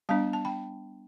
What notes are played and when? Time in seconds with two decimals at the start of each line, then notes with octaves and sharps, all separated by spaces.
0.09 G3 B3 D4 F5 A5
0.33 A5
0.45 G5 B5